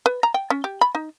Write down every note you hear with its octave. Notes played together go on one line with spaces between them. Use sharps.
B4
A#5
G5
C#4
G4
B5
D#4